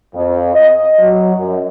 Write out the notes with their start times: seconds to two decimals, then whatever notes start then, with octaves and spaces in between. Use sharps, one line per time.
0.14 F2
0.55 D#5
1.00 F#3
1.35 F#2